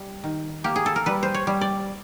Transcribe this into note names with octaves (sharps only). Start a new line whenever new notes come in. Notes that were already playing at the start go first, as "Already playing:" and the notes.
Already playing: G3
D#3
A#3 G4
G#4
A4
A#4
G3 B4
C5
C#5
G3
D5